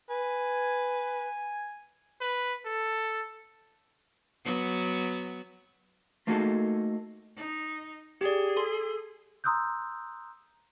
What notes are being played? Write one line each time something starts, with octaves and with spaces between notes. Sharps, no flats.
B4 G#5
B4
A4
F#3 B3
A3 A#3 D#4 F#4 G#4 A4
D#4
G4 G#4 D5
A4 C6
A#5 C6 D#6 E6 F#6 G6